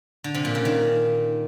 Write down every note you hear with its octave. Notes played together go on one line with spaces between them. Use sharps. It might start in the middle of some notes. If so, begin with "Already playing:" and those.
D3
C3
A#2
C#3
D#3